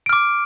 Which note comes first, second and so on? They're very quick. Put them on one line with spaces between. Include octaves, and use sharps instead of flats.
D7 F6 D6